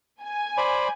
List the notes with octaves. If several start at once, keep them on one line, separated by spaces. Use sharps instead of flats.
G#5
C5 D5 B5